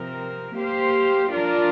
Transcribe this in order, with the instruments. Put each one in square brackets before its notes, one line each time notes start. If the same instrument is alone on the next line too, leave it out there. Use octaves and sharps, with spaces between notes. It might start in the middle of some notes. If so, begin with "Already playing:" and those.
Already playing: [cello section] C3 F3 C4 A#4
A#3 G4 C5 F5
F3 D4 F4 A#4 D5